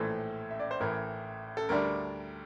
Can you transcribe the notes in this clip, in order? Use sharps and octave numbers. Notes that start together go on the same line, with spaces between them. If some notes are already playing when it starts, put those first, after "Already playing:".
Already playing: A#1 A2 E3 A3 A4 C5
E5
D5
C5
A1 A2 E3 A#4
A4
D2 D3 G3 D4 A#4